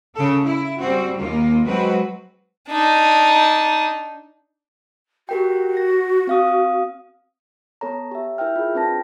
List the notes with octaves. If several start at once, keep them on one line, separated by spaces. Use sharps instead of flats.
C#3 A4
E4
G3 C4 F#4
D#2 A#3 F4
F#3 G#3 C4 F#4 B4
D4 D#4
F#4 G4 A#4 G5
A#6
C4 F5 D#6
B3 A4 C#5 A#5
G4 E5
E4 A#4 E5 G5 F6
F4 G#4
C4 D4 B4 G5 A5 A#6